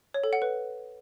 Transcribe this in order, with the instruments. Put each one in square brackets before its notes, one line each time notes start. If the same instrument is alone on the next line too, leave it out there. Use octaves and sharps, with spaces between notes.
[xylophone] C#5
A4
F#5
B4